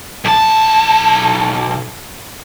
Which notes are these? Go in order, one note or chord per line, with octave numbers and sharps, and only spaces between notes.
B1 A5